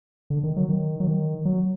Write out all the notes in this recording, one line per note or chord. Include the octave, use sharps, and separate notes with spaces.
D3
D#3
F#3
D#3
F#3
D#3
F#3